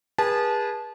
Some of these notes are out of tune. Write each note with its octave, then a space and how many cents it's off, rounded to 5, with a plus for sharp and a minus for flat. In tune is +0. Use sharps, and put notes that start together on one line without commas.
G#4 -30 B4 -35 A5 -20